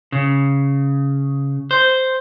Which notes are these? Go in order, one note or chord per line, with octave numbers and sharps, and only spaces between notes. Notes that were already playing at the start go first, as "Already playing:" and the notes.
C#3
C5